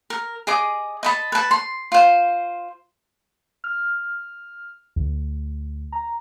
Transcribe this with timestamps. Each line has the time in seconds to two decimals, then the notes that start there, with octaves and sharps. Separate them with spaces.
0.10 A#4
0.47 G#4 D#5 D6
1.03 D#5 A5 B5
1.32 B4 A5
1.51 C6
1.92 F4 C5
3.64 F6
4.96 D2
5.92 A#5